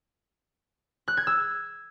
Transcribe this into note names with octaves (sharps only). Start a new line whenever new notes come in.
F#6
G#6
E6